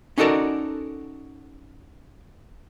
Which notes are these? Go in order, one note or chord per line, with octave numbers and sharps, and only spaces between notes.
C#4 D#4 F#4 A4 A#4 D5